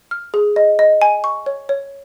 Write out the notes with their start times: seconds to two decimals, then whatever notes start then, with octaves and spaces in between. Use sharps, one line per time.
0.11 F6
0.34 G#4
0.56 D#5
0.79 D#5
1.02 G#5
1.24 C#6
1.46 C#5
1.69 C#5